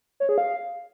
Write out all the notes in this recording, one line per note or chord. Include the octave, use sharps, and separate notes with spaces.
C#5
G#4
F5